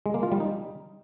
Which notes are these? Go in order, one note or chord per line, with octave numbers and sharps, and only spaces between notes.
G#3
A#3
F4
G3
D#4